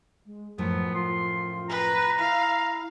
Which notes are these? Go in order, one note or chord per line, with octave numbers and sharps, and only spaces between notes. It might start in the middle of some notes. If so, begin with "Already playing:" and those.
G#3
F#2 A2 F3 F#3 B3
F4 C6
B4 A#5
E4 F5